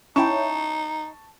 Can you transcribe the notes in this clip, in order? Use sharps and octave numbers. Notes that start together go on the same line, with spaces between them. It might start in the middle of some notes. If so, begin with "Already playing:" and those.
C#4 D#4 E4 G5 A5 C#6